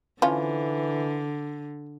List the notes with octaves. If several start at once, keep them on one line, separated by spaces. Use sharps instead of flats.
D3 E3 F3 C#4 F4